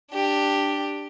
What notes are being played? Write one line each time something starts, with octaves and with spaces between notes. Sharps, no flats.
D4 G4